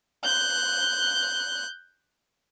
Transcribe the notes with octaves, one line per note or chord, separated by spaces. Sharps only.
F#6 G6